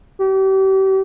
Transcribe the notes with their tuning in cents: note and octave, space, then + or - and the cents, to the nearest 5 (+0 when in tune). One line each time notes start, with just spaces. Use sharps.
G4 -35